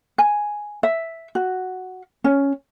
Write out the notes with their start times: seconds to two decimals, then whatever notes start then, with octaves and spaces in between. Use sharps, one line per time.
0.18 G#5
0.83 E5
1.35 F#4
2.24 C#4